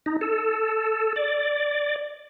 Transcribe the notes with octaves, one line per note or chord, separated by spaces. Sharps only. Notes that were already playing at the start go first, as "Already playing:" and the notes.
D#4
A4
D5